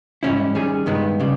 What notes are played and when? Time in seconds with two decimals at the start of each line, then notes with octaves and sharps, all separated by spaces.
0.23 G#2 E3 G3 C#4 E4
0.55 D#3 G3 C#4 G#4
0.86 G2 D#3 G#3 B3
1.20 C#3 G3